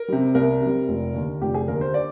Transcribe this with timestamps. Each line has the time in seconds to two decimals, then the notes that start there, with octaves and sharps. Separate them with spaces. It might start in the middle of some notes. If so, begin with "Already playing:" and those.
Already playing: A#4
0.08 C3 G3
0.35 C2 A#4
0.61 C3 G3
0.88 F1
1.14 D#2 D3
1.41 F1 G4
1.54 G#4
1.68 D#2 D3 A#4
1.81 C5
1.94 D5